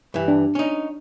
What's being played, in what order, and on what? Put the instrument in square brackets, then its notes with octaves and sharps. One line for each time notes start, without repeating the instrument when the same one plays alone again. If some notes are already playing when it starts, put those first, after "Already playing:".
[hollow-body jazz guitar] G2 E3
[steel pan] D4
[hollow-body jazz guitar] C#4 D#4